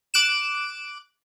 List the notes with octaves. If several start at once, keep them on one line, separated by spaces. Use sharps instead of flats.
D6 F#6 D7 E7